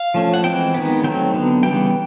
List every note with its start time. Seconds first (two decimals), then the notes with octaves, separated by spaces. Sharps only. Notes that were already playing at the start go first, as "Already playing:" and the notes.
Already playing: F5
0.14 F3 A3 C#4
0.34 F#5
0.44 E3 G#3 C4 G5
0.74 D#3 G#3 B3
1.04 D#3 F#3 A3 C4 G5
1.34 D3 F#3 B3
1.63 C#3 E3 G3 B3 G5